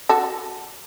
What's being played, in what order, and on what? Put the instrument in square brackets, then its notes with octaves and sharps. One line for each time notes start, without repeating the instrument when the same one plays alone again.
[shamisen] F#4 A4